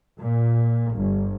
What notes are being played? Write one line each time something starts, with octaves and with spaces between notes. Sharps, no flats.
A#2
G1